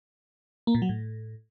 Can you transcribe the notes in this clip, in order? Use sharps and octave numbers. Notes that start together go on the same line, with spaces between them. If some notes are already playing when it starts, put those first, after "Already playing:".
A#3
A#2
F#3
A2